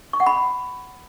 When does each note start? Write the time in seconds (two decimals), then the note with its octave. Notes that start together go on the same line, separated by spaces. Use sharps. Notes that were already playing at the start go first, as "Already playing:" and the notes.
0.13 C#6
0.20 F#5
0.26 B5